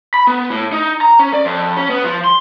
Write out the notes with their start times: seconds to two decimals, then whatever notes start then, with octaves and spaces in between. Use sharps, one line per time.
0.14 B5
0.27 B3
0.50 A2
0.72 D#4
1.01 A#5
1.19 C#4
1.33 D5
1.45 F2
1.77 C#4
1.90 B3
2.04 F3
2.24 C6